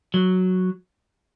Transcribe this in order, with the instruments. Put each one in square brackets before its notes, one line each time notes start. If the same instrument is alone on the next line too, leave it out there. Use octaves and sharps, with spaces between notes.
[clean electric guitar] F#3